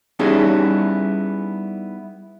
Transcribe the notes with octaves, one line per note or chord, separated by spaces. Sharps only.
G3 B3 C#4 D#4 E4 G#4